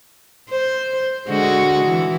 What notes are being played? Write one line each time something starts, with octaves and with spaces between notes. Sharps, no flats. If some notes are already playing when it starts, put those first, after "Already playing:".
C5
D3 G#3 F#4
E3